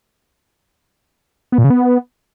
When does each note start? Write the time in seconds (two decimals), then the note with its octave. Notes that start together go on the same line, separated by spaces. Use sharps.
1.52 B3
1.58 A#2
1.64 C#3
1.70 B3